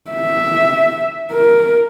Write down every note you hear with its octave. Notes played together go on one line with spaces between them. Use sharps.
E5
A#4